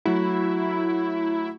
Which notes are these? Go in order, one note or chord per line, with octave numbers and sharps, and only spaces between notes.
F#3 A3 E4 F#4